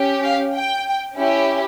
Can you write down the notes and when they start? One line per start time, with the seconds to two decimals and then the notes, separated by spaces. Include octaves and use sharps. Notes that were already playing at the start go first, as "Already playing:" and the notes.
Already playing: C#4 G4
0.23 F5
0.55 G5
1.16 C#4 E4 G4